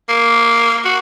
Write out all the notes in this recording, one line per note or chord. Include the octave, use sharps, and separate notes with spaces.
A#3
F#4